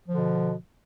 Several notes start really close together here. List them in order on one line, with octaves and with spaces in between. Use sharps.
F3 D3 B2